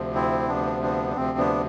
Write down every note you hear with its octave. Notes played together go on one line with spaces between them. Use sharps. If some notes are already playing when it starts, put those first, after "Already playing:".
Already playing: D2 C3 F3
C4 E4
D2 C3 F3 B3 D4
B3 D4
D4
D2 C3 F3 C4
B3 D4